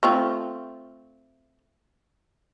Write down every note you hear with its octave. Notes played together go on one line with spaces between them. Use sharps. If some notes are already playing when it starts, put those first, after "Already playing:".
A3 C4 F4